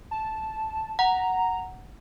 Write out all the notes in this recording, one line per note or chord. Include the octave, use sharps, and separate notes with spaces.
A5
F#5 A#5